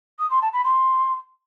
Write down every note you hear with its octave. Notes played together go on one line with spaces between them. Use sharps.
D#6
C6
A5
B5
C6